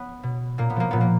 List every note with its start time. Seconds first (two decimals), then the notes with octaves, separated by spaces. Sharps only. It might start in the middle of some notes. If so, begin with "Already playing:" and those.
Already playing: B3
0.23 B2
0.58 A#2 A#3
0.70 B3
0.76 F3 A#3
0.91 A#2 B3
1.01 A#3